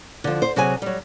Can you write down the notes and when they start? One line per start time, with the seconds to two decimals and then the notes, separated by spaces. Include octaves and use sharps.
0.24 D3 F3
0.42 C5
0.56 C3 F#3 G#4 G#5
0.82 F#3 G3